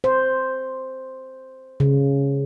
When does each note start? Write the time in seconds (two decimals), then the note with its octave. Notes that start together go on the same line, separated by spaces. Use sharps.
0.04 C5
1.80 C#3